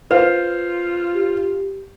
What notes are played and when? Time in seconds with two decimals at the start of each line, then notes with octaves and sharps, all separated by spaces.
0.11 F4 B4 C5 F5
1.15 G4